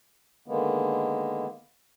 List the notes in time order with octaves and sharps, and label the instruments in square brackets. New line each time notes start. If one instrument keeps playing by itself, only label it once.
[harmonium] D3 D#3 G#3 A#3 B3